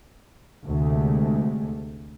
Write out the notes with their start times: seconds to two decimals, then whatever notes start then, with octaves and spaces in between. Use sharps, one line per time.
0.66 D2 C3 G#3 A3